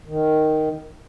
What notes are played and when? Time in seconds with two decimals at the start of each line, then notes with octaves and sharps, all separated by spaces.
0.07 D#3